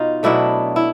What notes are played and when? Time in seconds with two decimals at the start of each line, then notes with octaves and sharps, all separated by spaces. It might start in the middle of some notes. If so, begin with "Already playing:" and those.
Already playing: B2 D#4 F4
0.23 B2 F#3 A3 D4 E4
0.76 E4